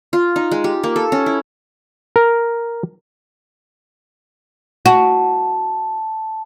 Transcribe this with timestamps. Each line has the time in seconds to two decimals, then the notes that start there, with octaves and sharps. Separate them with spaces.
0.13 F4
0.36 D#4
0.51 G#3
0.64 G4
0.83 A#3
0.96 A4
1.12 C#4
1.26 E4
2.16 A#4
4.86 F#4 A5